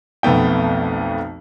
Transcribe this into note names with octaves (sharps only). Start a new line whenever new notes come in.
B1 F2 A3 B3 G5